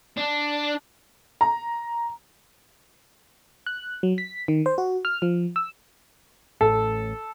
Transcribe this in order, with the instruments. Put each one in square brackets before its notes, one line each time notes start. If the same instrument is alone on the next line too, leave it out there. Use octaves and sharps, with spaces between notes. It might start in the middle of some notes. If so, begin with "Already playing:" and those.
[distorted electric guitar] D4
[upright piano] A#5
[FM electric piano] F#6
F#3
B6
D#3
C5
F#4
F6
F3
E6
[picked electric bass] A1 A2 [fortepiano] A4